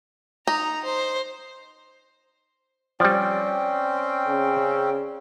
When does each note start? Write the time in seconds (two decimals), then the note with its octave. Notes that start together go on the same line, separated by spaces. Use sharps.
0.47 D#4 A#5
0.84 C5
3.00 F3 G3 C4 C#4 D5 G5
4.27 C#3